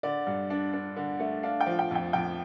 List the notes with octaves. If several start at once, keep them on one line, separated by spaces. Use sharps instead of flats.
D3 D5
G2
D4
D4
D3
A3
D4 F5
G5
F3
G5
F2 G5
F2 G5